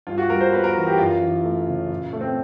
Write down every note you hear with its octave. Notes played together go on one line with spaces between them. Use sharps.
G2 F4
F#4
G3 A#4
C5
B3 B4
A#4
E3
G4
F#2 F4
E3
A3
C#3
A#2
A3
C4